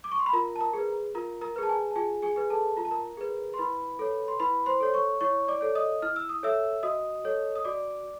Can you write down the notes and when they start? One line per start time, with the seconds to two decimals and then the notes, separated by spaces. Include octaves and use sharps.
0.04 D6
0.12 C#6
0.19 C6
0.26 B5
0.33 F4 A#4 A#5
0.56 A5
0.61 A#4 A#5
0.73 G#4 B4
1.15 F4 A#4 A#5
1.41 A#4 A#5
1.56 G#4 B4
1.63 A5
1.69 G#4 G#5
1.91 A5
1.96 F4 G#4 G#5
2.22 G#4 G#5
2.36 G#4 B4
2.50 A4 A5
2.77 F4 A#5
2.85 A5
2.91 A#4 A#5
3.17 G#4 B4
3.54 C6
3.58 E4 B4 B5
3.99 A4 C#5
4.28 C6
4.40 E4 B4 B5
4.66 C5 C6
4.80 A4 C#5
4.94 C#5 C#6
5.21 E4 C#5 C#6
5.48 D5 D6
5.61 A4 C#5
5.75 D#5 D#6
6.02 E4 F6
6.16 E6
6.29 D#6
6.43 A4 C#5 E5 E6
6.83 F#4 D#5 D#6
7.24 A4 C#5
7.55 D#6
7.64 F#4 D5 D6